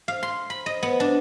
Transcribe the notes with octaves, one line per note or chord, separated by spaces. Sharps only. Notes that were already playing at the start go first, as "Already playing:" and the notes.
F5
C6
B5
D#5
B3
D4